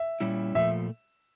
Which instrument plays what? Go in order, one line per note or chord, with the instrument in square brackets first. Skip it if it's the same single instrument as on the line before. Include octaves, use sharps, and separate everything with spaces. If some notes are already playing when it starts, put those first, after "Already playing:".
Already playing: [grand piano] E5
[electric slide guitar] A#2 G3 C#4 E4
[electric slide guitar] A#2 F3 A3 [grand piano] E5